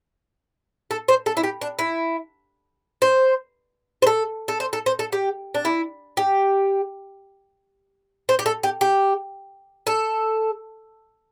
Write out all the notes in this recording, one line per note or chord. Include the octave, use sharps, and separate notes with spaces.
A4
C5
A4
E4
G4
D4
E4
C5
C5
A4
A4
C5
A4
C5
A4
G4
D4
E4
G4
C5
G4
A4
G4
G4
A4